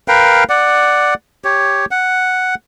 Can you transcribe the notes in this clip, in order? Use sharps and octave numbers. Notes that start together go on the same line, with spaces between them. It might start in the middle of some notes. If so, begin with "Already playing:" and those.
A#4 B4 F5 G5
D5 F#5
G4 C#5
F#5